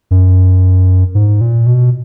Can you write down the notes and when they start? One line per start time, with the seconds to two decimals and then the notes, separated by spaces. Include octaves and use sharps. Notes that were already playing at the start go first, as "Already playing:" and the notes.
0.11 F#2
1.15 G#2
1.41 A#2
1.66 B2